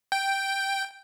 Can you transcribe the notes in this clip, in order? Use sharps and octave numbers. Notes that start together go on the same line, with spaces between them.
G5